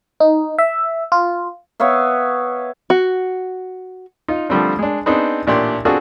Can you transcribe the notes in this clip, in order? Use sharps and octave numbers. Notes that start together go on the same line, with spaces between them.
D#4
E5
F4
B3 C#5 E5 F5
F#4
D#4 F4
D3 F3 G3 A3 C4 D4
G#3 D4
B3 C4 D4 D#4 G#4 C5
A1 A#2 D4 G4 G5 C6
C4 D4 F4 F#4 G#4 A4